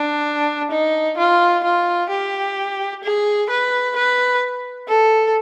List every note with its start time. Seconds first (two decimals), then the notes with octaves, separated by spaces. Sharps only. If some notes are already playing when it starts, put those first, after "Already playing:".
Already playing: D4
0.71 D#4
1.18 F4
1.64 F4
2.10 G4
3.03 G#4
3.50 B4
3.96 B4
4.89 A4